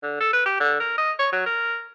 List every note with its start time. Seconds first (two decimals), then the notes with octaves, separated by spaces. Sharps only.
0.03 D3
0.20 A4
0.33 B4
0.46 G4
0.60 D3
0.80 A#4
0.98 D#5
1.19 C#5
1.32 F#3
1.46 A#4